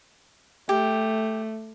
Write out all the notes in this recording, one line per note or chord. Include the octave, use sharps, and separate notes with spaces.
A3 G4